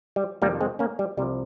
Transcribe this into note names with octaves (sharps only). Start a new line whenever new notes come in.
G3
F2 C3 D#3 G3 A#3
G#3 C4
A#3 C#4
G3
C2 C3 F3 G3